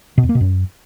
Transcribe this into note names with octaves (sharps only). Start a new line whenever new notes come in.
B2
E2
A#3
B2
F#2